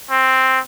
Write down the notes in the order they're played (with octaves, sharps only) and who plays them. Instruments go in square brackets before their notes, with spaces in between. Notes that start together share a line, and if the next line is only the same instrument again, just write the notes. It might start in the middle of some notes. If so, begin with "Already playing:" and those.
[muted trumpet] C4